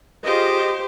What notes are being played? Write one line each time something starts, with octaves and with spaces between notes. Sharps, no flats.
F4 G4 G#4 C5 D#5